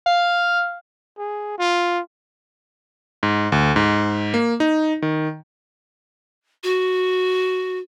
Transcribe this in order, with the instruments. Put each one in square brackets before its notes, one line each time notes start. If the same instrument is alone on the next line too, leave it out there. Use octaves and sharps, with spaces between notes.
[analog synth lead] F5
[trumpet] G#4
F4
[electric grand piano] G#2
D2
G#2
A#3
D#4
D#3
[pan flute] F#4